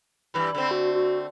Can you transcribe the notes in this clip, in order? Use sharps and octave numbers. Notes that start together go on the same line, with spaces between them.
G2 E3 G3 B5
D3 A3 C4
F#4
F#4